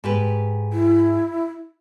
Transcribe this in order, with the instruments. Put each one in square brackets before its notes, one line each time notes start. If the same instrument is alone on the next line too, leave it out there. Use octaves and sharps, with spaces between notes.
[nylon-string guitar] G#2 G4 B4
[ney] E4